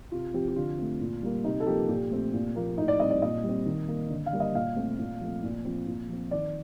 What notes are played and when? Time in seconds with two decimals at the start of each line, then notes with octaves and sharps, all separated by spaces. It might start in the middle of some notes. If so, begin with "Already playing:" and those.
0.11 C3 F4
0.34 F3 C4 G4
0.48 G4
0.56 D3 F4
0.78 A3 C4
1.00 A#2
1.23 G3 A#3
1.44 C3 D#4
1.60 A4
1.67 F3 A#3 G4
1.88 A#2 G4
2.11 A3 C4
2.34 A#2
2.55 F3 A#3
2.77 A2 D#4
2.88 D5
3.00 G3 C4 D#5
3.10 D5
3.22 A#2 D#5
3.43 G3
3.49 C4
3.66 D#3
3.88 A#3
4.10 D3
4.26 F5
4.33 G3 A#3
4.40 D#5
4.55 A#2 F5
4.76 A3 C4
4.98 A#2
5.21 F3 A3 C4
5.43 A#2
5.65 F3 C4
5.87 A#2
6.09 F3 C4
6.31 D#3 D5